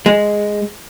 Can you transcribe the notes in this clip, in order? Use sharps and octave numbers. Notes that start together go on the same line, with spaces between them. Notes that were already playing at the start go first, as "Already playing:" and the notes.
G#3